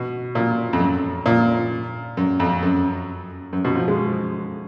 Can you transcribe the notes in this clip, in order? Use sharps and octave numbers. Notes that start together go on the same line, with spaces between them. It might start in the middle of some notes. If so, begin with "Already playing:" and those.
Already playing: B2
A#2
F2
F#2
A#2
F#2
F2
F#2
F#2
B2
F3
G#3